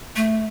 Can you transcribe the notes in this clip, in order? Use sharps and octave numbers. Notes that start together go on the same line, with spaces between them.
A3